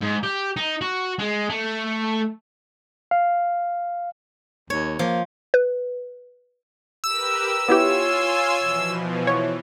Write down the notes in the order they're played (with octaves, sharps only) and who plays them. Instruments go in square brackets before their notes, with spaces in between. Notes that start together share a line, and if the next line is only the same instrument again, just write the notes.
[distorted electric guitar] G#2
G4
D#4
F#4
G#3
A3
[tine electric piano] F5
[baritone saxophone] D#2 [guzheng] C#5
[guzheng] F3 [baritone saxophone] A#3
[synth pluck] B4
[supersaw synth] G4 A#4 B4 [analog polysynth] E6
[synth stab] B3 E4 G4 [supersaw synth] F4 G#5 C6 [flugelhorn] C#5
[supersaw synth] B2 E3 F3
[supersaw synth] E3 [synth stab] C#5